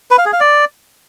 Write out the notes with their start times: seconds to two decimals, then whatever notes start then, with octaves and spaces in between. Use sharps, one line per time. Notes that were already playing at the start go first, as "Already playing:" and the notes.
0.11 B4
0.18 F5
0.26 G#4
0.33 F5
0.40 D5